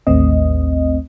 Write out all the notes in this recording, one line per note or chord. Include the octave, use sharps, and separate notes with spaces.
A1 D#2 A3 C4 D#5